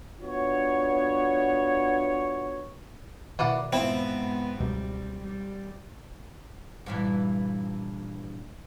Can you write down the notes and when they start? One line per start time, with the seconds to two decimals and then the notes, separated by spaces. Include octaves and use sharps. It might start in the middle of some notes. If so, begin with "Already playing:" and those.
0.22 B3 D4 F4 F#4 C#5
3.39 B2 D#3 E3 A#3 D5 F#5
3.73 G#2 F3 B3 C4 E4
4.60 C#2 B2 F#3 G3
5.23 G3
6.86 G2 A#2 E3